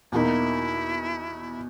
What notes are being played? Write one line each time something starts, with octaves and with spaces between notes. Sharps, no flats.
E2 B2 A#3 D#4 E4 F#4